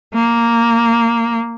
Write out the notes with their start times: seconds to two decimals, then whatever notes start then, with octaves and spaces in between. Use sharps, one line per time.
0.14 A#3